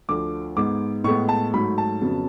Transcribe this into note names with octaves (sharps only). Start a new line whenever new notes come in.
D2 D3 F3 D6
G#2 G#3 B3 D6
A2 G#3 B3 C#6
A5
G#2 F#3 A3 B5
A5
F2 C#3 F#3 B3